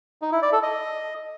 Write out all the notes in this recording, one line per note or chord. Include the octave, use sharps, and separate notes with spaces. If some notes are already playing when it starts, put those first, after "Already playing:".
D#4
E4
D5
A4
D#5